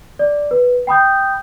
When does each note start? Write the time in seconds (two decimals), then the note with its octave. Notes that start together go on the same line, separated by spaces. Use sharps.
0.19 D5
0.51 B4
0.87 G5 B5 D#6 G6